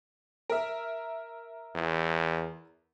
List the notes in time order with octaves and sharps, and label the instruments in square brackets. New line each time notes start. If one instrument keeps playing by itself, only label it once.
[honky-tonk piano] A#4 E5
[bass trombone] E2